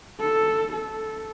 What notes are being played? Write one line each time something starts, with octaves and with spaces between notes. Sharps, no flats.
A4
A4